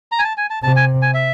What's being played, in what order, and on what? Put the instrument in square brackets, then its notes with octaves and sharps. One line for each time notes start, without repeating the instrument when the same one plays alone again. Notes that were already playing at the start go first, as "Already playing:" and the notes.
[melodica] A#5
G#5
A5
G#5
A5
[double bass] C3 [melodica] A5
[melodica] G#5
G#5
E5